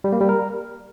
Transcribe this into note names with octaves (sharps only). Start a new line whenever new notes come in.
G3
A#3
G3
A#4